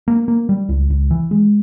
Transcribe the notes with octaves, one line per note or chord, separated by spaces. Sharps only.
A#3
A#3
G3
C#2
C#2
E3
G#3